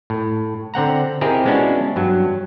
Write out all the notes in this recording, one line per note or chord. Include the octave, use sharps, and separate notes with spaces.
A2
D3 C4 F#5 A#5
C4 D#4 E4 G4 G#4 A#4
G#3 B3 C#4 D4 E4 F#4
G2 F#3